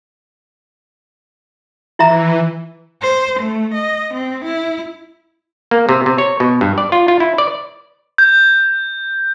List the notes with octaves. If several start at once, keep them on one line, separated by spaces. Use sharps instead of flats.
E3 E4 E5 A#5
C5
A3
D#5
C4
E4
A#3
C3
C3
C#5
B2
G2
D5
F4
F4
E4
D5
G6